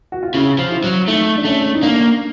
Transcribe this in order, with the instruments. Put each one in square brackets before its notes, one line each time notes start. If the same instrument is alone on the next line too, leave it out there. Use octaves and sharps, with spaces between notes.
[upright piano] F#4
F4
[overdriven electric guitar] C#3 [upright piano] E4
[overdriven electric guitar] F3
[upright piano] E4
[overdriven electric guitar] F#3
[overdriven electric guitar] A3 [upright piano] D#4
[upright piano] D4
[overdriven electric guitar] A3 [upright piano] C#4
[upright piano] D#4
[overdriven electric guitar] A#3 [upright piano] D4